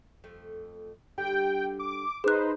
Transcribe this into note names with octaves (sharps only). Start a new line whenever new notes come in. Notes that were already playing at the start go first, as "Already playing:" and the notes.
F2 A3
D3 G3 G4 G5
D6
D#4 G#4 B4 C5 F#6